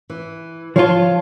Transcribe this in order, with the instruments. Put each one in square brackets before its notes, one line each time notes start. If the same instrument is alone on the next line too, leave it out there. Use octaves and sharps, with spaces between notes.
[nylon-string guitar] E3
[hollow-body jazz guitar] F3 F4 [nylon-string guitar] C#5 F5 A5